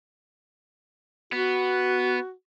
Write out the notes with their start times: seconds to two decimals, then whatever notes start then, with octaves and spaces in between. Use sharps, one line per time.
1.33 B3 F#4